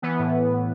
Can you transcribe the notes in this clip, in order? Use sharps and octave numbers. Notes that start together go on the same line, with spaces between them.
E3 B3
A2